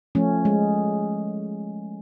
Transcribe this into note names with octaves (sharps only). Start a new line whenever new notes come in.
F3 A3 C#4
G#3